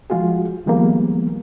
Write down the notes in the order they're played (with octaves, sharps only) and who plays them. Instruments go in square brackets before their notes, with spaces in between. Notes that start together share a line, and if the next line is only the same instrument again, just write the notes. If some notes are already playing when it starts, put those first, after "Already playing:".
[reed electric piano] F3 G#3 F4 F#4 G#4
D#3 F3 G3 G#3 A#3 B3